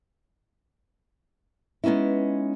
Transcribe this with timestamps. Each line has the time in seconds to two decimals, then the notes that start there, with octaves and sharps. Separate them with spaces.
1.84 G#3 B3 C#4 D#4 E4